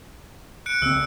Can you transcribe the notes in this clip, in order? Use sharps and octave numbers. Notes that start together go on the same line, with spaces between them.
F#6 C#7 D7
C#2 C4 E6